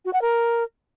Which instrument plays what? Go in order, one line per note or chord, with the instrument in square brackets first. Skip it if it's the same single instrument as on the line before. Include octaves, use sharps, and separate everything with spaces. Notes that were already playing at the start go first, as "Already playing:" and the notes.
[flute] F#4
F#5
A#4